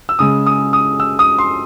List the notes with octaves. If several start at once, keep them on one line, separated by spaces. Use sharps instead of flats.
E6
C#3 G#3 D#6
D#6
D#6
E6
D#6
C6